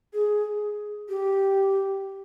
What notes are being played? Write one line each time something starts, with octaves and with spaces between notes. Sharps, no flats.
G#4
G4